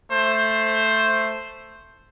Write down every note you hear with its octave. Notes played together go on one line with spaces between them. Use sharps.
A3 C5